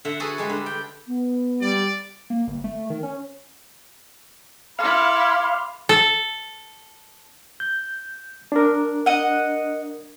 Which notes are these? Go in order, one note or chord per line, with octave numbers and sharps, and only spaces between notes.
D3 E5 F#5
F#4 G#4 A4 B4
G3 G#3 D4
D3
G5
B3
G3 D5
A#3
G1
A3
D#3
C#4
E4 A4 F5 B5 C6 D6
A4
G6
D4 A#4
D#5 F#5